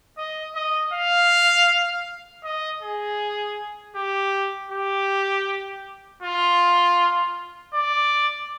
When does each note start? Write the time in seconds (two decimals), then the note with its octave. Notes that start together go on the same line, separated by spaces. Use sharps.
0.18 D#5
0.55 D#5
0.93 F5
2.44 D#5
2.82 G#4
3.96 G4
4.71 G4
6.23 F4
7.74 D5